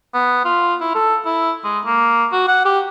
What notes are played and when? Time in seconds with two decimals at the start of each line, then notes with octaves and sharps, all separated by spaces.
0.14 B3
0.45 F4
0.80 E4
0.95 A4
1.25 E4
1.64 G#3
1.85 A#3
2.32 F#4
2.48 F#5
2.65 G4